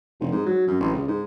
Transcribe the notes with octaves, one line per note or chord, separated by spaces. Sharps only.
F1
G#2
F#3
F#2
A1
C#2
G#2